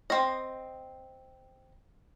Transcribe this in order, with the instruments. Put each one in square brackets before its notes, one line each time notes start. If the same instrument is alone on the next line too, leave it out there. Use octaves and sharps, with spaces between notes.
[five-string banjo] C4 D#5